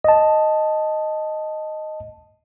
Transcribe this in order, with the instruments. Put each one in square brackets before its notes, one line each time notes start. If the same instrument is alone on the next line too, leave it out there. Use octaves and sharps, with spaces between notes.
[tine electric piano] D#5 A5